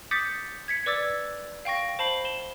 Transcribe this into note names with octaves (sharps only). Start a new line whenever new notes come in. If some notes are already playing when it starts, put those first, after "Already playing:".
D6 D#6 G6 A6 B6 C#7
G#6 B6 C#7
B4 D5 D6 E6 G#6 A6
F5 G5 C#6 A#6
C5 A5 B5 C7
E7 G7